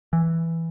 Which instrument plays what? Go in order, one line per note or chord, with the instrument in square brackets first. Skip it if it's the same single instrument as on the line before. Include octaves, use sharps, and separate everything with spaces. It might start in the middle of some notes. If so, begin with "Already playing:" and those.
[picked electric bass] E3